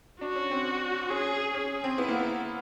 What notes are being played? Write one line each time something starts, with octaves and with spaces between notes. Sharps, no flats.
D4 F#4
C#4
C4
C#4 G#4
C#4 G#4
C4
B3 E4
A#3
B3